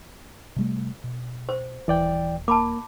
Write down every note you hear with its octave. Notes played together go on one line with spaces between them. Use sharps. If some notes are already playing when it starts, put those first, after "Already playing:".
C3 G3 A3
B2
C5
D#1 E3 D5 G5
A#3 A5 B5 D6